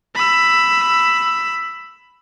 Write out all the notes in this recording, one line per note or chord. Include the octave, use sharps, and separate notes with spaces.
B5 E6